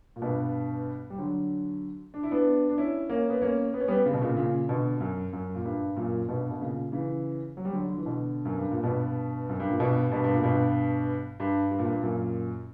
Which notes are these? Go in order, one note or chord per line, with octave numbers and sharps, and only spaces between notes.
A#2
G2 B2
G3
D3 F#3
D4
E4
B3 D4
D4
C#4 E4
A#3 C#4
B3
A#3 C#4
B3
C#4
G3 B3
C#3
B2
A#2 C#3
A#2 C#3
B2 D3
F#2
F#2
A#2
G2
F#2 A#2
G2 B2
B2
A#2 C#3
C#3 E3
F#3
G3
D3 F#3
D3
E3
B2 D3
F#2
G2
A#2
G2 B2
F#2
G2
A#2
G2 B2
G2 B2
G2
A#2
G2 B2
G2
G2
A#2
G2
F#2 A#2